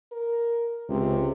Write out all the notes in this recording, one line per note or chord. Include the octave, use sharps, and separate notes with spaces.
A#4
C#2 C3